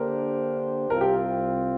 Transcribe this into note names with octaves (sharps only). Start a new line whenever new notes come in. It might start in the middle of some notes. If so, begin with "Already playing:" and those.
Already playing: D3 A#3 D4 G4 A#4 C5
C2 C3 G3 C4 F4 A#4
G4